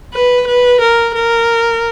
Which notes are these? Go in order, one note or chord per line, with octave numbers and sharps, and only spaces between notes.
B4
B4
A#4
A#4